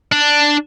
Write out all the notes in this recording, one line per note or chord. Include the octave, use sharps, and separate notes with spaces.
D4